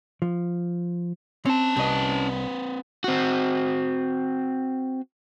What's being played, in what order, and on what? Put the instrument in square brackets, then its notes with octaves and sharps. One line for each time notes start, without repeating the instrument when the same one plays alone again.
[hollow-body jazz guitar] F3
[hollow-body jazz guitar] C4 [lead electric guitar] C#4 A5
[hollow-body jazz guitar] C2 D#5 [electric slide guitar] C4 B4
[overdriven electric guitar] C4 F#4